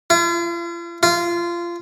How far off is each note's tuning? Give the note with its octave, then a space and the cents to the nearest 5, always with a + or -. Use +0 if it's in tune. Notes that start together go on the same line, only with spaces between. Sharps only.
F4 -40
F4 -20